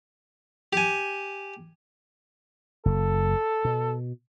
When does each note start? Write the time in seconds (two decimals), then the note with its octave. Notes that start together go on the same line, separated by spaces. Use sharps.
0.73 G4 G#5
2.86 F#1 A4
3.65 B2